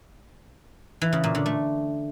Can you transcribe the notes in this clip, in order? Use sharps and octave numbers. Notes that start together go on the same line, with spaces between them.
E3
C#3
A#2
D3
A3